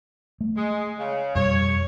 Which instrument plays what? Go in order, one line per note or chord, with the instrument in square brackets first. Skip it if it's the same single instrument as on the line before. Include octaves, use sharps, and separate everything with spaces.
[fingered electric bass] A3
[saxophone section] G#3
C#3
[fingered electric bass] F2 B2 G3 [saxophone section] C#5